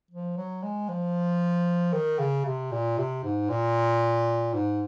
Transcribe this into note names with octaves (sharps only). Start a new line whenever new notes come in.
F3
F#3
G#3
F3
D#3
C#3
C3
A#2
C3
G#2
A#2
G#2